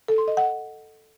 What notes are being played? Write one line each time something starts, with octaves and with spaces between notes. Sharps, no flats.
A4
C6
D#5
F#5